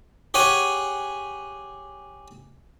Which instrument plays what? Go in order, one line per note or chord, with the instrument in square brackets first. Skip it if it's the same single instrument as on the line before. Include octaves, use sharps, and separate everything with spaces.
[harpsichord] G4 G#4 C#5 F#5 G#5